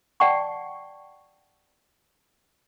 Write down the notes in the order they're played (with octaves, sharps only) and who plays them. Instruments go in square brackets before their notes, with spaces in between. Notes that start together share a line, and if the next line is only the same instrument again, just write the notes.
[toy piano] D5 F#5 G5 A5 C#6